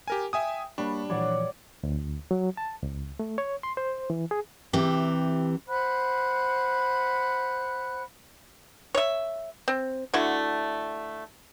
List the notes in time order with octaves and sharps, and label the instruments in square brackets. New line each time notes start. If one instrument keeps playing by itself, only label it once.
[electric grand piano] G4 A#4 G#5
[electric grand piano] E5 G#5 D#6 [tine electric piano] G5
[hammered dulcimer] G3 [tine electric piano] A#3 B5 C#6 [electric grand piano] D4
[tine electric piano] A#2 E3 F3 [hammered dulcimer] C#5 D5 F#5
[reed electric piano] D2
F#3
A5
C#2
A3
C#5
C6
C5
E3
G#4
[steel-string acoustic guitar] C3 E3 G4
[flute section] C5 F#5 B5 F#6
[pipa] C#5 E5
C4
D3 A3 E4 F#4